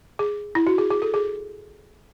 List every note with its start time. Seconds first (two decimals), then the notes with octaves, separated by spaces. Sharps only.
0.19 G#4
0.55 E4
0.67 F#4
0.78 G#4
0.90 G#4
1.02 A4
1.14 G#4